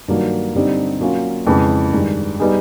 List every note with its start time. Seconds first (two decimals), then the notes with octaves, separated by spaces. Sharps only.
0.08 G2 D#3 F#3 A#3
0.55 G2 D3 G3 C4 D#4
1.00 F#3 A#3 C#4 F4
1.47 F2 C#3 E3 G#3
1.92 G2 D#3 G#3
2.40 G3 B3 D#4 G#4